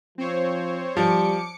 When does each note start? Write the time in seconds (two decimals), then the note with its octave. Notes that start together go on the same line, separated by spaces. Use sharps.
0.18 F3 C4 C5 C#5
0.97 F3 G3 D6 C#7